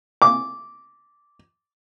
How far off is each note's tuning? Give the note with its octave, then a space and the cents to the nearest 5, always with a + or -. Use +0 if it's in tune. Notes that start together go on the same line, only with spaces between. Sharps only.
D6 -10